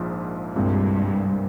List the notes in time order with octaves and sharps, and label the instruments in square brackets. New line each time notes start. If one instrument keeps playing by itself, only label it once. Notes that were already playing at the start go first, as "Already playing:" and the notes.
Already playing: [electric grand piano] A#1 G#2 F3 A#3
[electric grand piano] C2 A#2 G#3 C4 [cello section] G2